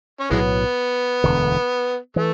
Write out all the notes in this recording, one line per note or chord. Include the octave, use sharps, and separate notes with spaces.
C#4
B1 A2 E3 F#3 G#3 B3
E1 D2 D3
E3 A3